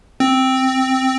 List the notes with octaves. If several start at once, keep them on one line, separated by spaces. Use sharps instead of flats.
C4